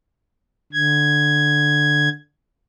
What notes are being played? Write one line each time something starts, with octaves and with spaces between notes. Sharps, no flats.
D3 G#6